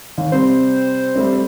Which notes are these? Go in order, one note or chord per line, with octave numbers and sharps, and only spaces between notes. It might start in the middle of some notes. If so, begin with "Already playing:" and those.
D#2
C3 G3 C4 C5
G3 A3 C4